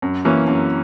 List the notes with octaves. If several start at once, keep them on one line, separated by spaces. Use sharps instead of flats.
F#2
E3 A#3 C#4
F#2